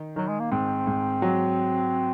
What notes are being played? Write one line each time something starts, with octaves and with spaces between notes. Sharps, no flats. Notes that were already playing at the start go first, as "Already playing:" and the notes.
Already playing: D#3
D#3 F#3
G#3
A#3
G#2 C4
G#2
F#3